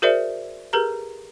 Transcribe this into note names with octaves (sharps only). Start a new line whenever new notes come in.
F#4 G#4 A#4 C5 D5 E5
G4 G#4 A#4 B4 A#5